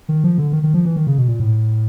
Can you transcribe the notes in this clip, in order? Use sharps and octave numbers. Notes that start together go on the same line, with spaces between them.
D#3
F3
D3
D#3
D#3
F3
E3
D#3
C#3
B2
A#2
A2